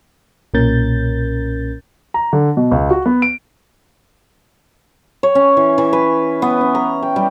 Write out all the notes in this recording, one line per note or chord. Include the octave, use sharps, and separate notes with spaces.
B1 A#2 C#4 A#4 G6 A6
A#5
D3
B2
C#2
F#4
B3
D7
C#5
C#4
E3
E3
B4
B3
C#4
A#5
G5
G3